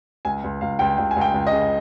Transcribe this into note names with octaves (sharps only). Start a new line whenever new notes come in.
C#2 G#5
C#2
C#2 F5
C#2 G5
C#2 G5
G#5
C#2 G5
C#2
D#5
C#3